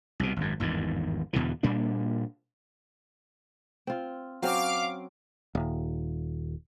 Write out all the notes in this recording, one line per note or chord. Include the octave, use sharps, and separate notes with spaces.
C2 B2
G#1 F#2
G#1 E2 G2 D#3
E2 B2 D3 E3
A#2 G3 A#3 D4
C4 F4
F#3 C4 C#4 F5 D6
D#1